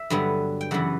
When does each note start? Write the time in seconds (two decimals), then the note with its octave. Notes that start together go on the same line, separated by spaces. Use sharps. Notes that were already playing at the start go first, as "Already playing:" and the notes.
Already playing: E5
0.10 G2 D3 F#3 B3
0.61 G5
0.71 F#2 C#3 E3 B3 F#5